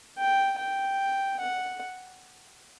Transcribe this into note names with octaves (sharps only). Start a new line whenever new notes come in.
G5
G5
F#5